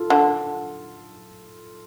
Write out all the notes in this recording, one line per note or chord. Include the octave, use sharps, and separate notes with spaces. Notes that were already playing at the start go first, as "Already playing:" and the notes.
Already playing: F4 A4
D3 D4